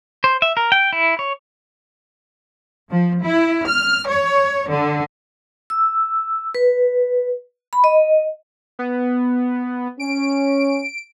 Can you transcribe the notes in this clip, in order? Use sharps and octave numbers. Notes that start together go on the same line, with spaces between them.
C5
E5
A#4
G5
E4
C#5
F3
E4
F6
C#5
D3
E6
B4
B5
D#5
B3
C#4 D7